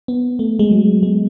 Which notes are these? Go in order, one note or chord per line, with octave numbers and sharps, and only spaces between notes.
B3
A3
G#3
F#3
G#3